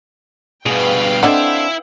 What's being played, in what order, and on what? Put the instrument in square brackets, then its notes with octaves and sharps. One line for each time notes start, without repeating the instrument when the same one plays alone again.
[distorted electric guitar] G2 B2 [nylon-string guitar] G#4 [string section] B4 F5 G5
[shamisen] D3 D#5 F#5 [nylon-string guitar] C4 D4 [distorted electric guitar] E4 E5